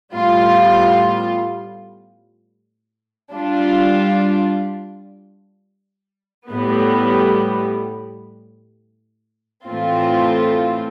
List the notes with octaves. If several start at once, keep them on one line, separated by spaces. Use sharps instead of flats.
A2 G3 B3 F4
G3 D4 F4
A2 G3 B3
A2 E3 A3 C4 F4